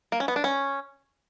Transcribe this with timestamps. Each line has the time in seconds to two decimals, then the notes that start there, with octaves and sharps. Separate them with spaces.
0.12 A#3
0.20 C#4
0.28 B3
0.36 D4
0.44 C#4